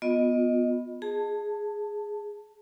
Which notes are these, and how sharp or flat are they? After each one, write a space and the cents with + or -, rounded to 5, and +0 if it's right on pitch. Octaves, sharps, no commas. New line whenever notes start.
B3 +0 F4 +30 D#5 +0
G#4 +0 A5 +10